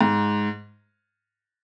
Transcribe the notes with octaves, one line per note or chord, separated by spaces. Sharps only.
G#2